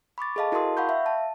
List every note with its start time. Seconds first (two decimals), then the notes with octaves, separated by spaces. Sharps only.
0.18 B5 C#6 D6 A6
0.36 G#4 A4 D#5 F5 A5
0.52 E4 F#4 A#4 A5 C6 D#6
0.77 F5 F#5 B5 C#6 G6
0.89 E5 F5
1.06 A5